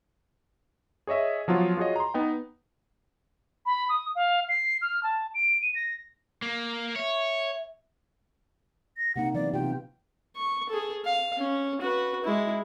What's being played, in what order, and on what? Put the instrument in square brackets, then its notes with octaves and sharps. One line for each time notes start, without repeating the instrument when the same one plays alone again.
[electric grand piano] G#4 C#5 D#5 E5
F3 F#3 B3 F4
F4 F#4 G#4 C#5 D#5
A#5 C6
B3 D#4 G5
[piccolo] B5
D#6
F5
C7
F6
A5
D7
D#7
A#6
[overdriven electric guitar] A#3
[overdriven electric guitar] C#5 [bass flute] E5
[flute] A#6
[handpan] C3 A#3 D#4 [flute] F#5
[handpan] E3 F#3 B3 [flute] D5
[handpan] C3 D#4 F4 [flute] G5
[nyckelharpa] C#6
G#4 A4
F5
C#4
F#4 B4
G#3 E4